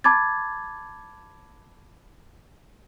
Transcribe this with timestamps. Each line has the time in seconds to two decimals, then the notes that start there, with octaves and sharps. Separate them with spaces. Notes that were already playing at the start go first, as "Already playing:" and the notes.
0.04 A5 B5 D6 G#6 A6